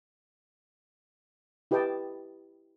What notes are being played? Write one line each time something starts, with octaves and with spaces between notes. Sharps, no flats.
E4 G4 B4 D#5 G5 A5